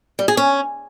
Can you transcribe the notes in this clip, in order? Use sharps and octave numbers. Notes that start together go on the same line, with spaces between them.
G3
G#4
C#4